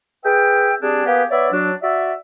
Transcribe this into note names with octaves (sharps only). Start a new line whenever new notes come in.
G#4 B4 E5 G5
G3 C4 D4 G#4
A#3 B3 G4 G#4 B4
B3 C#5 D5 E5
F#3 D4
F#4 D5 E5